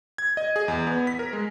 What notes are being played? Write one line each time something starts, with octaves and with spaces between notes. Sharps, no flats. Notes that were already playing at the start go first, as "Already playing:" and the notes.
G#6
D#5
G#4
E2
B3
B6
A#4
G#3